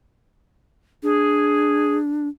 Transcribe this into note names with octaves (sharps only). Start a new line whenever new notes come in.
D4 G#4